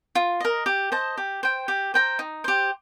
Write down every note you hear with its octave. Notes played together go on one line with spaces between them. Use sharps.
F4
A#4 D#5
G4
C5 D#5 A5
G4
C5 G5
G4
C5 G5 A#5
D#4
G4 C5